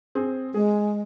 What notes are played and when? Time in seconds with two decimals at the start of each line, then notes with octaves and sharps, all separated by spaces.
0.15 C4 G#4
0.54 G#3 G#4